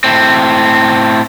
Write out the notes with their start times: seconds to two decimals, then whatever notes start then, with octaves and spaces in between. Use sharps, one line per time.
0.04 A2 C4